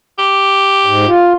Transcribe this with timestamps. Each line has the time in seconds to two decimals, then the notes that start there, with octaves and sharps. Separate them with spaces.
0.19 G4
0.86 G#2
1.07 F4